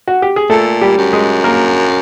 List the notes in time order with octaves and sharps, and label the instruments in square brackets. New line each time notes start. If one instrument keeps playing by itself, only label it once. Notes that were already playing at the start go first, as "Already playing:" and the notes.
[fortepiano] F#4
G4
G#4
[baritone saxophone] A#2 [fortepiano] A3 A4
[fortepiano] G3 G4
[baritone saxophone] F#2
[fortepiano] G#3 G#4
A#3 A#4